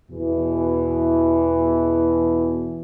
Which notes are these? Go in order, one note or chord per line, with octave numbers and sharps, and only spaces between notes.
E2 B2 E3